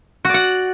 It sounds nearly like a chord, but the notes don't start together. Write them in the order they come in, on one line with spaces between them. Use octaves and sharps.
F#4 D5 F#5